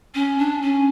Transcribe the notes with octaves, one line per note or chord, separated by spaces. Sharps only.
C#4
D4
C#4